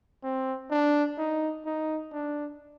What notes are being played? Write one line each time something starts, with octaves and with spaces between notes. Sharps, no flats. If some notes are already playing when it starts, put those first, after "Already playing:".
C4
D4
D#4
D#4
D4